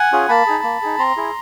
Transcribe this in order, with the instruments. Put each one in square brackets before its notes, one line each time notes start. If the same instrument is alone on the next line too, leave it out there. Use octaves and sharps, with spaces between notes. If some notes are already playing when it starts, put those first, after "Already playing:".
Already playing: [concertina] F#5 G#5
C#4 F4 G#4
A#3 A5 B5
D#4 G#4
A#3
D#4 G#4
C4 A#5 C6
E4 G#4